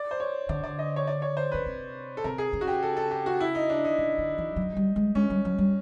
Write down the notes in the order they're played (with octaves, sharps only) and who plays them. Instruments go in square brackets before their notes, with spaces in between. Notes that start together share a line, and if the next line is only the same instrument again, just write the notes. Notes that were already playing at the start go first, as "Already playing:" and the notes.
Already playing: [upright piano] D5
C5
C#5
[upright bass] D3 [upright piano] D5
[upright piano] D5
D#5
C#5
D5
C#5
C5
[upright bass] C#3 [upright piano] B4
[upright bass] C3
[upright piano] A4
[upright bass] C3 [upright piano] A#4
[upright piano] G#4
[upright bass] C#3
[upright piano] F#4
G4
A4
A4
G4
F#4
E4
D#4
D4
D#4
[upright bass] C#3
D3
E3
F#3
G3
G#3
[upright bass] G#3 [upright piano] C#4
[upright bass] G3
F#3
G3